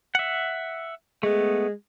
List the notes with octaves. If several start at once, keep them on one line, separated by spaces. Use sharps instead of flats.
E5 F#5
G#3 A3 B3